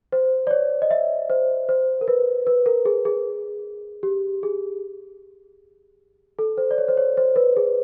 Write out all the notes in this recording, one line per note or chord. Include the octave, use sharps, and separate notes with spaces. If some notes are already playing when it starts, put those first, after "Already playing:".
C5
D5
C#5
D#5
E5
C5
C5
A#4
B4
B4
A#4
G#4
G#4
G4
G#4
A4
C5
D5
C#5
C5
C#5
C5
B4
G#4